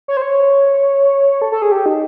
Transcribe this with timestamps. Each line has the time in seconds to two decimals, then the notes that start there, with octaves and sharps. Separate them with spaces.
0.08 C#5
0.17 C5
0.22 C#5
1.42 A4
1.52 A4
1.62 G#4
1.72 G4
1.86 D#4